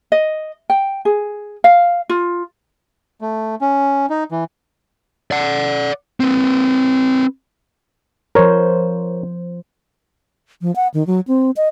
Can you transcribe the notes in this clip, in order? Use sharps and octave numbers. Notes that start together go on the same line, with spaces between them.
D#5
G5
G#4
F5
F4
A3
C#4
D#4
E3
D5 F#5
C4 B4
F3 A#4 C5 C#5
F3
F#5
D#3
F#3
C4
D#5